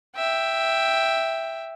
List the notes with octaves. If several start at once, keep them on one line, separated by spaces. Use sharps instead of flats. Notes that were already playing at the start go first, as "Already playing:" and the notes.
E5 G5